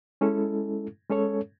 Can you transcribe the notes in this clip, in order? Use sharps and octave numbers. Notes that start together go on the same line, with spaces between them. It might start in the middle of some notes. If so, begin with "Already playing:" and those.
G#3 C#4 E4 A4
G#3 C#4 A4 C#5